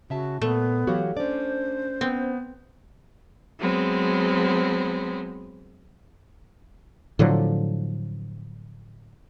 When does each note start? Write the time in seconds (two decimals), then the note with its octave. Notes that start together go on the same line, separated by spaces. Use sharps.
0.10 C#3 F#4 E5 A5
0.41 A#2 A3 B3
0.87 E3 F#3 F#4 G4 C#5 F5
1.17 C#4 D4 C5 D5
2.01 B3 C4
3.59 F#3 G#3 B3 C4
7.19 A2 D3 F3 F#3